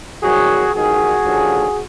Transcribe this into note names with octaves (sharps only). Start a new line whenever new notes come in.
C2 C3 D#3 F#3 F#4 G#4
A1 G#2 D#3 F#4 G#4
D#2 D3 F3